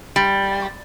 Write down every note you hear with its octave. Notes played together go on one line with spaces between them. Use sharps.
G3